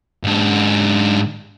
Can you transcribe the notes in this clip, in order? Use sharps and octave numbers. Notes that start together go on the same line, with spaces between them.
G#2 D4